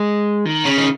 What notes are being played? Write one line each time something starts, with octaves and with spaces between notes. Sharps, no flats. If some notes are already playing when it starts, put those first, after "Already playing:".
Already playing: G#3
D#3
C#3
D#3